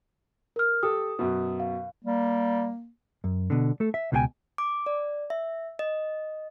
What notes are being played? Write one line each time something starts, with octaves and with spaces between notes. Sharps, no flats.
A#4 F6
G4 A4 D#6
F#2 B2
F5
G3 A#3
F#2
B2 D3
A3 A4
E5
C#2 B2 D#4 A4 G5 G#5
D6
D5
E5
D#5